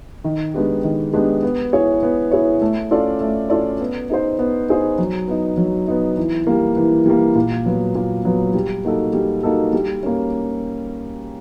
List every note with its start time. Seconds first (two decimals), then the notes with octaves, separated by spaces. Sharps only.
0.24 D#3
0.54 G#3 B3 D4 G4
0.84 D#3
1.14 G#3 B3 D4 G4
1.43 B3
1.72 E4 G#4 C#5
2.03 B3
2.31 E4 G#4 C#5
2.62 A3
2.91 C#4 F4 A4 D5
3.21 A3
3.50 C#4 F4 A4 D5
3.80 B3
4.10 D#4 G#4 C5
4.39 B3
4.69 D#4 G#4 C5
4.98 F#3
5.28 B3 D#4
5.58 F#3
5.88 B3 D#4
6.17 E3
6.47 G3 A#3
6.77 E3
7.06 G3 A#3
7.35 A#2
7.66 F#3 B3
7.95 A#2
8.25 F#3 B3
8.54 G3
8.84 A#3 D#4 F#4 A4
9.13 G3
9.43 A#3 D#4 F#4 A4
9.73 G3
10.03 A#3 C#4